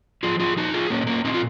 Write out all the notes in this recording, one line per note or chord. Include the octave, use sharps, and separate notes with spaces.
F3 F4 G#4
F4 G#4
F3 D#4 F#4
F4 G#4
A#2 A#3 C#4
A#3 C#4
A#2 C4 D#4
F4